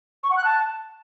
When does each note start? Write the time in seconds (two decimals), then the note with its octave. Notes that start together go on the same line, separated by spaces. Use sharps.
0.23 C#6
0.30 F#5
0.37 F#6
0.44 A5